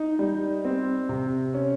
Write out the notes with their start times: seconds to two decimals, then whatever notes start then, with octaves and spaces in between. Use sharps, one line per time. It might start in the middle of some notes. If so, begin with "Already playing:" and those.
Already playing: D#4
0.19 G3
0.65 C4
1.09 C3
1.54 C#4